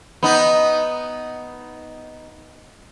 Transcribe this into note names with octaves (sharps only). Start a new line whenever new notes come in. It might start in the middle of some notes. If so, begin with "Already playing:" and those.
B3 D#4